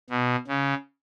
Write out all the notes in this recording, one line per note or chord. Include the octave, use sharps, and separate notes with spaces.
B2
C#3